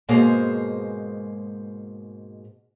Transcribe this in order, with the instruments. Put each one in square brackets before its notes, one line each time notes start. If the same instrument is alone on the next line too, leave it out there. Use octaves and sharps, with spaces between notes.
[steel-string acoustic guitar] G#2 B2 G#3 A#3 C5